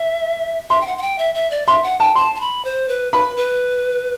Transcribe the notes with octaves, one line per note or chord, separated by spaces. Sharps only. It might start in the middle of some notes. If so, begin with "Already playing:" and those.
Already playing: E5
E5 C6
G5
F#5
F#5
G5
E5
E5
D5
E5 C6
F#5
G5 A5
A5 C6
A5
B5
C5
B4
B4 B5
B4